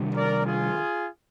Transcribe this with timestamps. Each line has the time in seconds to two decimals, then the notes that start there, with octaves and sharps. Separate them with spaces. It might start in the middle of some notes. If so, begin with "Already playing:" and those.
Already playing: C3 D#3 G3 D4
0.15 A#4 D5
0.45 F4 G#4